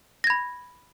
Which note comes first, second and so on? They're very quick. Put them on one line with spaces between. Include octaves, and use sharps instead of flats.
A#6 G#6 B5